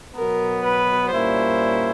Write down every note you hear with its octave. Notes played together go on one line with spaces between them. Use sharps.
B2 F#3 B3 A#4
B4
A#2 G3 A#3 C#4 E4 C5